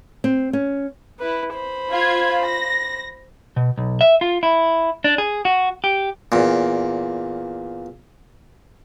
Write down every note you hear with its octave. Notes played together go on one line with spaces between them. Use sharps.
C4
C#4
E4 B4
C5 B5
F4 G#6
A#6
B2
B1
E5
F4
E4
D4
G#4
F#4
G4
E2 A#2